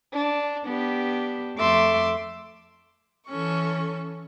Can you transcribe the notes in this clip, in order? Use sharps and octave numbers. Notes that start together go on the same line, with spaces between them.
D4
B3 D4 G4
F2 A3 E5 C6 D6
E3 C#4 A4 C#6